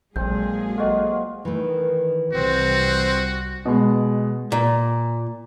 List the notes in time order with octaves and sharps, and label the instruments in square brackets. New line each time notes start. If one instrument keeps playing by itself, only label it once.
[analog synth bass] A#1 [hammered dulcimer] A#2 C4 A4 [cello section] F#3 G#3 G#4 [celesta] G6
[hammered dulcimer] F4 F#4 A#4 [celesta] A4 D#5
[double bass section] D#3 [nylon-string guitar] E3 A3
[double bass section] C2 G3 [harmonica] C4 [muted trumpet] F#4
[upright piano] B2 G#3
[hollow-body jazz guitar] A#2